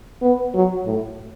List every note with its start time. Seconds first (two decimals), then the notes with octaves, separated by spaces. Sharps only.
0.22 B3
0.55 F#3
0.85 A2